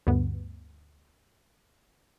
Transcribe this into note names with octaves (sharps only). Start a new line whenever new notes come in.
D2 G2 B3